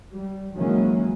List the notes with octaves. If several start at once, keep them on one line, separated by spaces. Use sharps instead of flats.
G3
D#3 E3 F#3 G#3 A#3 C#4